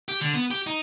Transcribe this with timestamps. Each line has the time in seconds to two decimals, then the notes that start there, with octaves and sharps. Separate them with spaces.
0.08 G4
0.21 D3
0.34 B3
0.51 G4
0.67 D#4